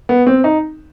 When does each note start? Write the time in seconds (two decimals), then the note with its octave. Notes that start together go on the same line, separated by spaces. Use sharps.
0.09 B3
0.27 C4
0.44 D#4